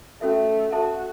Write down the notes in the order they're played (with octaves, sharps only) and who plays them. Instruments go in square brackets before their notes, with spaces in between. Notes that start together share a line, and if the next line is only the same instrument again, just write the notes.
[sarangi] A3 [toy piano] C#4 F#4 A4 E5
[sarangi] F#4 [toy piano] A4 E5 A5